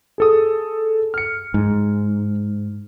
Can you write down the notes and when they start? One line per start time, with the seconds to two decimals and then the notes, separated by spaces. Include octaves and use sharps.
0.18 G#4 A4 D#6
1.14 F6 C#7
1.54 G#2